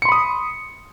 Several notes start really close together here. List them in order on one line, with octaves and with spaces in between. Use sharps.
C#7 C6 B5 D#6